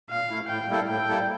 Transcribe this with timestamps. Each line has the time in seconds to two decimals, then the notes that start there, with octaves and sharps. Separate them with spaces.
0.10 A#2 F5
0.30 A3 E4
0.49 A2 G5
0.68 G3 A#3 E4 A4
0.88 A2 G5
1.08 G3 A#3 E4 A4